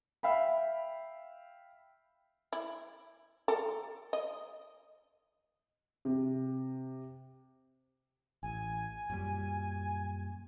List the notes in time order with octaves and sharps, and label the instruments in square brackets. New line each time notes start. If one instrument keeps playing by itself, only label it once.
[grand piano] E5 F5 G5 B5
[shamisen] E4
A4 A#4
D#5
[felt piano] C3
[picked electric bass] A1 [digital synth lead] G#5
[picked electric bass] F#2 A#2 G3